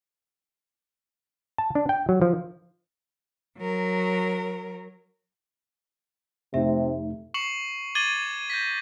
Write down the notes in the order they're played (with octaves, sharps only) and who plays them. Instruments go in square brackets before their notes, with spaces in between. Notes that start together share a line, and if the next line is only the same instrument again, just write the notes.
[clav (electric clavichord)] A5
D4
G5
F#3
F3
[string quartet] F#3 A#4
[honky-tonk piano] F1 [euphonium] C3 [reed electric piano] A3 D#4 [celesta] E5
[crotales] C#6 C7 C#7 E7 F#7
D6 G#6 A6 D#7 F#7 G7
G6 A#6 B6